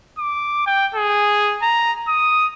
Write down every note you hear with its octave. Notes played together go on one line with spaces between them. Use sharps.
D6
G5
G#4
A#5
D#6